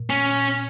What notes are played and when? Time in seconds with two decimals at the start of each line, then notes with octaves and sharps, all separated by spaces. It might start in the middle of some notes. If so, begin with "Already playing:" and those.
Already playing: A#2
0.10 C#4